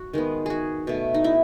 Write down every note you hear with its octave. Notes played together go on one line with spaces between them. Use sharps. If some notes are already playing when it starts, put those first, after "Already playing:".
Already playing: F#4
D#3 G#3 B3
F#4 G#4
B2 A3
D#4
E4